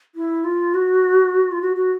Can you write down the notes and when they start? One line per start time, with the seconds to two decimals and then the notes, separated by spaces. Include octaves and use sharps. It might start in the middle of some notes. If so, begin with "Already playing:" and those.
0.15 E4
0.44 F4
0.74 F#4
1.52 F4
1.61 F#4
1.75 F#4